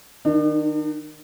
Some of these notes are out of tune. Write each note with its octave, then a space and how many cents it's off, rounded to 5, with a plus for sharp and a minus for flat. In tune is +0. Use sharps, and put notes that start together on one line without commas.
D#3 +0 D4 +45